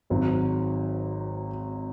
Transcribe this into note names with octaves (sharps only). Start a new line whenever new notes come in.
G#1 G#2 F#3